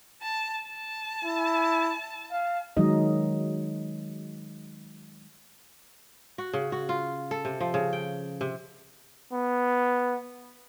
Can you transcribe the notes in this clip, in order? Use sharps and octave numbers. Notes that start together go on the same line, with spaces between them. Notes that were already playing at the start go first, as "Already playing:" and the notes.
A5
A5
E4
F5
D#3 F#3 G#3 D#4 D#5
F#4
C#3
F#4
F4
A4
C3
F3
C#3
G5
C3
B3